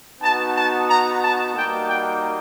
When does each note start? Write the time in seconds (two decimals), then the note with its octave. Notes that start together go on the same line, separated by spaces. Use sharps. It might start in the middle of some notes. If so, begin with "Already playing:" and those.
0.21 B3 D#4 F#4 A5
0.55 A5
0.88 A#5
1.21 A5
1.54 G3 A#3 D#4 F#4 G5
1.87 G5